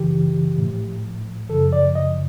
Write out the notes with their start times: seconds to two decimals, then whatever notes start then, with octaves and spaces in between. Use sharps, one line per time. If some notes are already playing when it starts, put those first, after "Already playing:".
Already playing: F#2 C#3 E3 G4
0.58 A2 F3
1.50 F#2 C#3 F3 A4
1.73 D5
1.95 D#5